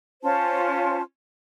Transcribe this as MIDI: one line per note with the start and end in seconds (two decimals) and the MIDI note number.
0.23 1.01 61
0.23 1.01 65
0.23 1.01 72
0.23 1.01 81